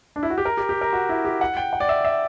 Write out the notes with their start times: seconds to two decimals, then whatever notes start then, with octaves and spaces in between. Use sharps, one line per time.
0.16 D4
0.23 E4
0.30 F#4
0.38 G4
0.45 A#4
0.57 G4
0.69 G4
0.81 A#4
0.93 F#4
1.09 E4
1.25 G4
1.41 F#5
1.57 G5
1.73 F#5
1.80 D5
1.89 E5
2.05 E5